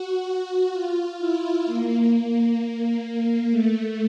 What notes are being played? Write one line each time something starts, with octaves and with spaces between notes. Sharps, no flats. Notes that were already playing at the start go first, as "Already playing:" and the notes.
Already playing: F#4
F4
E4
A#3
A#3
A3